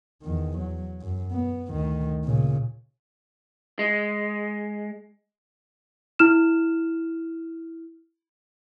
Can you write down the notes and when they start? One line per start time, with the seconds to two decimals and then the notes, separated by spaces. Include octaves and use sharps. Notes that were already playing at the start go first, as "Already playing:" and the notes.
0.23 E2 D#3
0.58 F#3
1.01 F#2
1.32 B3
1.71 D2 D#3
2.24 A#2 C#3
3.79 G#3
6.19 E4 F6 E7